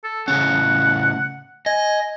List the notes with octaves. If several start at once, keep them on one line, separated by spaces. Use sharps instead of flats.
A4
A2 C#3 C#4 F#5
D#5 G#5